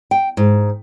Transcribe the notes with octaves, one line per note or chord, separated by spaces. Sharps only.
G5
G#2